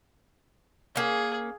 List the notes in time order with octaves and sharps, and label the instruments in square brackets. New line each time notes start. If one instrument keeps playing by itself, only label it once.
[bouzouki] A#3 C#4 [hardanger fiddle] G#4